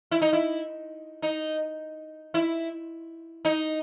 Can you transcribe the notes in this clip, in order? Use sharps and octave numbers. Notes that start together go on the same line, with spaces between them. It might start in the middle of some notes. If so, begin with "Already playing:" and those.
E4
D#4
E4
D#4
E4
D#4